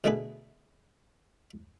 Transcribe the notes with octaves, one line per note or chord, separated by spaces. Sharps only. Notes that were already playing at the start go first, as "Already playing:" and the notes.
B2 D3 A3 D4 G#4 B4